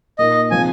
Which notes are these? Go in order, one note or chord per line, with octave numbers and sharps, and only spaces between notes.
A#2 A#3 D#4 D#5
C3 F3 G#3 G#5